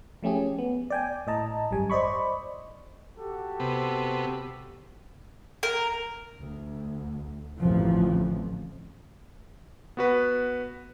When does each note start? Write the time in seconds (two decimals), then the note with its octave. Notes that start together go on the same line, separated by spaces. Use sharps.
0.23 F3 A3 C#4 G4 G#4
0.58 B3
0.90 D5 G5 G#5
1.27 A2 D#5 A5 A#5
1.71 G#1 F#2 G3 G#5
1.90 C5 D5 D#5 B5 C#6
3.16 F#4 G4 A4
3.60 C3 B3
5.63 A#4
6.38 D2
7.59 A1 F2 D3 E3 F3
9.97 B3 F#4 B4